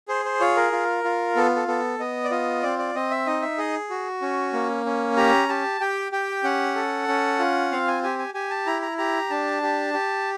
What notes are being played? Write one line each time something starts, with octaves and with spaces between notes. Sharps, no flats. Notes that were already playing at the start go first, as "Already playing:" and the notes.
G#4 C5
C5
F4 C#5
A#4
F4
F4
B3 A4
A4
B3 A4
B3 D#5
D5
F4 D#5
C4 D5
D5
C4 D#5
E5
D#4 D#5
E5
G#4 D#5
F#4
C#4
A#3
C#4
G4 A#5
G4 A5
G4 G5
G4 G5
C#4 F#5
A4
C#4
F4
C4 F5
G#5
G4 G#5
G#5
G4 G#5
A5
E4 A#5
A#5
G4 A#5
D4 A5
G4
G4